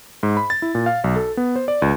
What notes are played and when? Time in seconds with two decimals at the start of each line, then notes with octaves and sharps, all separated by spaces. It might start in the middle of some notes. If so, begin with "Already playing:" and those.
0.23 G#2
0.37 B5
0.50 A6
0.62 E4
0.75 A#2
0.86 F5
1.04 B1
1.16 A4
1.37 B3
1.56 C5
1.68 D5
1.82 C#2